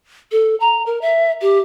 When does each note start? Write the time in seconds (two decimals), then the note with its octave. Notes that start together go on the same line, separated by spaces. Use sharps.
0.32 A4
0.60 A#5
0.86 A#4
1.01 E5
1.41 G4